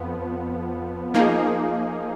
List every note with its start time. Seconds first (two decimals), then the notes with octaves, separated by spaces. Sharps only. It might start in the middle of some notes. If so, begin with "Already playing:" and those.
Already playing: F2 F3 B3
1.14 F3 A#3 D#4 G#4